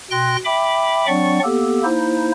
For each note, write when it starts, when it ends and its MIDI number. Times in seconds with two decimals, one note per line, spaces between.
0.11 0.37 47
0.11 0.37 79
0.11 0.37 84
0.11 0.37 90
0.11 0.37 94
0.45 1.06 76
0.45 1.06 79
0.45 1.06 83
0.45 1.06 86
1.07 1.39 54
1.07 1.39 60
1.07 1.39 62
1.07 1.39 74
1.07 1.39 78
1.07 1.39 85
1.44 1.84 58
1.44 1.84 59
1.44 1.84 67
1.44 1.84 69
1.84 2.31 58
1.84 2.31 63
1.84 2.31 64
1.84 2.31 72